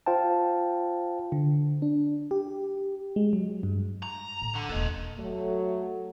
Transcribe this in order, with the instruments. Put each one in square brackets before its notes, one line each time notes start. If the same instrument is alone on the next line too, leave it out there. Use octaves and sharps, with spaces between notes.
[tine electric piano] F4 C5 F5 G5 A5
[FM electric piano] D3
D4
G4
G#3
F#3
G2
[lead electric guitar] A#5
[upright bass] A2
[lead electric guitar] D3
[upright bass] E1 A#3 [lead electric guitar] A4 D#5
[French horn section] F#3 A3